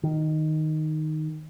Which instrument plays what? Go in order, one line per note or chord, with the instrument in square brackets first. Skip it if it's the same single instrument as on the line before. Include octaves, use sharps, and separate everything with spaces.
[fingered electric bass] D#3